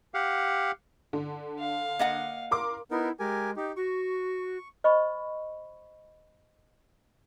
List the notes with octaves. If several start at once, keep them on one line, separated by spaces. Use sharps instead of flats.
G4 F5 F#5
D3
F5
A#3 D#5 F#5
A#4 C6 D6
B3 D#4 E4 A#4
G#3 G4 A#4 G#5
D#4 G4
F#4 C#6
C5 D#5 B5 C#6